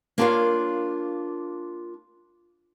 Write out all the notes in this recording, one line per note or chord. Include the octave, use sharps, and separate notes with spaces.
A#3 D4 F4 A#4 C#5 F5